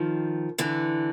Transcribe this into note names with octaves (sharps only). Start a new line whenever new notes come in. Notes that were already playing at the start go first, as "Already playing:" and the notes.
Already playing: D#3 F3
D3 E3